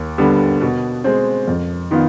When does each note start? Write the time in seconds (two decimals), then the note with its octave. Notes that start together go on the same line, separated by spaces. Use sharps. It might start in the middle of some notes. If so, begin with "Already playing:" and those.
Already playing: D#2
0.18 D3 G3 B3
0.61 B2
1.04 G#3 C4
1.48 F2
1.91 D#3 B3 F4